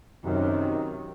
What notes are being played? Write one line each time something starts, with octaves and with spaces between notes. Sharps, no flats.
F#2 C3 D#3